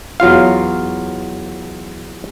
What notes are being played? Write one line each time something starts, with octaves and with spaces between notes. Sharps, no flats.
E2 F#3 F4 F5